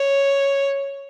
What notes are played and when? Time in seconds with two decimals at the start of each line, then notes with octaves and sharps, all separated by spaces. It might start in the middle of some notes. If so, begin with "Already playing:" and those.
Already playing: C#5